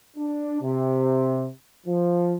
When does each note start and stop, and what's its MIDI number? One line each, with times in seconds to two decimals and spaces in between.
0.17 0.59 62
0.61 1.47 48
1.87 2.36 53